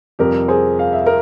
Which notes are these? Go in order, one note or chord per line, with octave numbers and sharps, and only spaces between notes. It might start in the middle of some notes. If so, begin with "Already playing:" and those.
F2 C3 G3 G4 A#4
G#4 C5
F5
E5
A#4